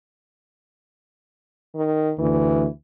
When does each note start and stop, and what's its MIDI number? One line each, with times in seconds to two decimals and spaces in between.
1.75 2.12 51
2.19 2.66 38
2.19 2.66 52